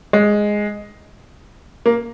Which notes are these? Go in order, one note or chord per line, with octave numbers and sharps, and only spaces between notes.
G#3
A#3